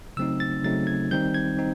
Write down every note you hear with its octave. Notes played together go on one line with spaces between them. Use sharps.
C#3 F#3 A3 C4 D#4 E6
A6
C#3 F#3 A3 C4 D#4 A6
G#6
D#3 G3 C4 D#4 G6
G#6
C4 D#4